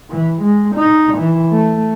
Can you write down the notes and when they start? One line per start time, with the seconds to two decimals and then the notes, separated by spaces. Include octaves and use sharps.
0.10 E3
0.42 G#3
0.76 D#4
1.18 E3
1.53 A3